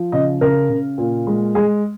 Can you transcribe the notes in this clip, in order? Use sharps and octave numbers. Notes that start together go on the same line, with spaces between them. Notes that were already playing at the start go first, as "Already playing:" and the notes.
Already playing: F3
C#3 D#5
C#3 A#4
C#3
A#2
G#3
G#3 G#4